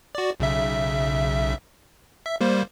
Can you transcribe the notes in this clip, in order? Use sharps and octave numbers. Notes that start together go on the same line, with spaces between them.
F#4 D5
B1 C#3 E5
E5
G3 A#3 C5